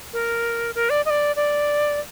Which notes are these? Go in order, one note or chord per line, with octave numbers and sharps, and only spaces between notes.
A#4
A#4
D5
D#5
D5
D5